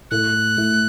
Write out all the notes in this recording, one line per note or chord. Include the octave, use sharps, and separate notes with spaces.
A2 A3 E4 F#6
A2 A3 E4